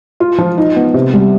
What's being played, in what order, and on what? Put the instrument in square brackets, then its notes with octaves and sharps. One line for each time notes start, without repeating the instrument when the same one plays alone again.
[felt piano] F4
F3
D#4
B3
C3
G3